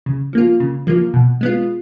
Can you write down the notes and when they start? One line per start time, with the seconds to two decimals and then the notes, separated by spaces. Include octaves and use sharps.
0.06 C#3
0.33 F3 A#3 F4
0.60 C#3
0.87 F3 A#3 F4
1.14 B2
1.41 G#3 B3 F4